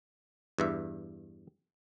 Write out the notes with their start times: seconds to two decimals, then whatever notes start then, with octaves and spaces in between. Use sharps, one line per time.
0.58 E2 G2 E5